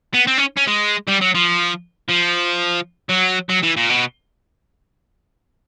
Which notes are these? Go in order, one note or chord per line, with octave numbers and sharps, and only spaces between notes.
B3
C4
C#4
C#4
G#3
G3
F#3
F3
F3
F#3
F#3
E3
A#2
B2